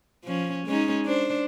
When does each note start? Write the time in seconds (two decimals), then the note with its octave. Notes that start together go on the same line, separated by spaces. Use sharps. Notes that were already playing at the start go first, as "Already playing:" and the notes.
0.24 F3 C#4
0.67 G#3 C#4 D#4
1.06 D4 C5